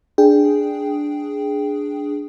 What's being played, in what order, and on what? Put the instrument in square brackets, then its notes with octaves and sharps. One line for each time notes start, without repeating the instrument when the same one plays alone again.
[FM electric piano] D4 G#4 G5